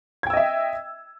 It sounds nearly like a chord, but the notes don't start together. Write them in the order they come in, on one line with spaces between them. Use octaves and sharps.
G#6 G5 E6 D#5 E5